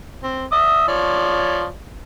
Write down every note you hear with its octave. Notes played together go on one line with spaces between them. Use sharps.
C4
E5 D#6
F3 C#5 D5